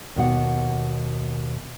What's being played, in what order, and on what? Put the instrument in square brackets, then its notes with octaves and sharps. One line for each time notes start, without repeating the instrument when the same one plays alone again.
[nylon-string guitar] D#2 B2 F#5